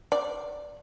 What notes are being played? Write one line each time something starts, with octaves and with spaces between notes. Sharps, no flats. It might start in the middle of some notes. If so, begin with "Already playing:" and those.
D5